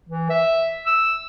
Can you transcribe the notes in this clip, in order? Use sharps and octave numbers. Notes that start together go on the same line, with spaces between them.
E3
E5
E6